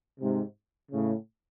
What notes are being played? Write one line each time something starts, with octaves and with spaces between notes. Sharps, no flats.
G#2 C3
A2 C#3